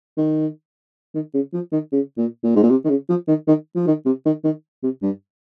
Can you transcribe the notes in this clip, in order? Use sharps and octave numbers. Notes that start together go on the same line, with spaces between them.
D#3
D#3
C#3
F3
D#3
C#3
A#2
A#2
G#2
A#2
C3
D#3
C#3
F3
D#3
D#3
F3
D#3
C3
D#3
D#3
C3
G2